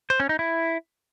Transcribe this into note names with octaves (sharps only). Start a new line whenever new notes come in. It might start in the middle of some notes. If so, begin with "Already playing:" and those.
C5
C#4
D#4
E4